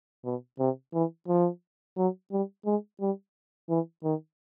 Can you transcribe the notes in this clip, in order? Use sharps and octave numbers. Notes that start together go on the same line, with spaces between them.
B2
C3
E3
F3
F#3
G3
G#3
G3
E3
D#3